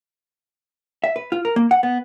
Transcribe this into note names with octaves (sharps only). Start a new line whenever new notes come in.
E5
B4
F4
A#4
A#3
F#5
B3